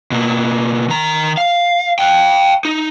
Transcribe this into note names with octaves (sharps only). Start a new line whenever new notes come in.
B2 A#3
D#3 A#5
F5
F5 G5
D#4